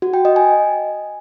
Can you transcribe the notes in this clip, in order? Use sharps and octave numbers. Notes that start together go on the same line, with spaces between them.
F#4
G5
D#5
G#5